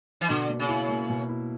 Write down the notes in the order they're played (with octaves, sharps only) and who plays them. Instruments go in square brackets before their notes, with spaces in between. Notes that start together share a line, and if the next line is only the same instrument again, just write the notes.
[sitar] E3
[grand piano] B2 [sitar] D3
[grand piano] A#3
[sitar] C#3
[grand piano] E4
A#3
B2
E4